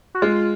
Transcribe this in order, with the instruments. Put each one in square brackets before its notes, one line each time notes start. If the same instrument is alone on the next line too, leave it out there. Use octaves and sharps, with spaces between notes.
[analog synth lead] F#4
[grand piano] G#3 [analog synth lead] F4